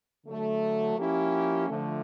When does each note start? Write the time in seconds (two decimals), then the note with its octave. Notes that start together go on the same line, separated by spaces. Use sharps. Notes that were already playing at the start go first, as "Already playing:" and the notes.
0.25 D3 F#3 A3
0.97 F3 A#3 C#4 E4 G4
1.69 D3 F3 A3